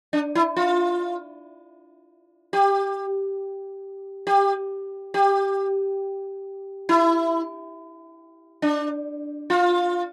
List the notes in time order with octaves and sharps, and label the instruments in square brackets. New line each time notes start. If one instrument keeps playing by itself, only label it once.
[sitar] D4
E4
F4
G4
G4
G4
E4
D4
F4